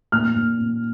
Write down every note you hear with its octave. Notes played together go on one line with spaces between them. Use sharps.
A#2 F6
A#2
A#2